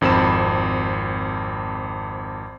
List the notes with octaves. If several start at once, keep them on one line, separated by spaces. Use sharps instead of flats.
G#1 F2 C4 B5 E7